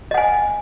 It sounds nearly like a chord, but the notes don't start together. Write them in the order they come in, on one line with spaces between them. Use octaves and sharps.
D#5 F#5 G#5